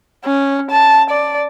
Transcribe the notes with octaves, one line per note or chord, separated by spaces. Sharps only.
C#4
A5
D5